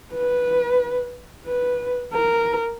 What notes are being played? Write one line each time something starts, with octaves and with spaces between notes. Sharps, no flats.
B4
B4
A#4